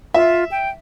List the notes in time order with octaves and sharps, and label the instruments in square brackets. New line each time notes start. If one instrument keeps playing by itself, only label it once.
[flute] F4 [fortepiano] E5
[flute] G5